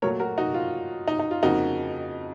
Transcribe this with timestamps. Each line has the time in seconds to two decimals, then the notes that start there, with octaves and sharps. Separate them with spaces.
0.02 A#2 F#3 A3 A#4 C#5
0.20 F#4 A#4
0.38 D#4 F#4
0.54 F4
1.08 D#4
1.19 D#4
1.31 F4
1.43 F2 C#3 F3 A#3 D#4 F#4